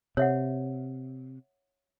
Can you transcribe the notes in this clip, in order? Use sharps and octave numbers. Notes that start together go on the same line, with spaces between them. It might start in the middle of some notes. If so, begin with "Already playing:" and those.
C3 C#5 E5 F#5